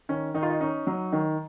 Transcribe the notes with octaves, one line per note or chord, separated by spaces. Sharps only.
D#3 C#4
D#3 D#4
F4
D#4
C#4 D#4
F#3
D#3